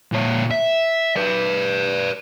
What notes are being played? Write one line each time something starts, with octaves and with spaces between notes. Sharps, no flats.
A#2 C#5
E5
B4 D5